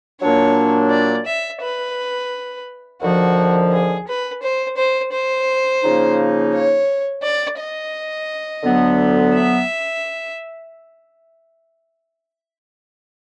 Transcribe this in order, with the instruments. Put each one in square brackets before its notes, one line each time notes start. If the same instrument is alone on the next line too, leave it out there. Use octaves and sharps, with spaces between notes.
[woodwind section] A#2 F#3 A#3 D4 [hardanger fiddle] C#5
[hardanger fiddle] D5
E5
B4
[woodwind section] D#2 D3 F3 [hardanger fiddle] F#4
[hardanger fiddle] G#4
B4
C5
C5
C5
[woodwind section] C#3 F3 A#3 D#4
[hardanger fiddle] C#5
D5
D#5
[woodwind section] D2 D3 F#3 B3
[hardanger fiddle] E5